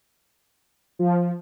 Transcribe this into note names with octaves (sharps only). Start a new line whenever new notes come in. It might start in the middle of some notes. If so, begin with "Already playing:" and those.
F3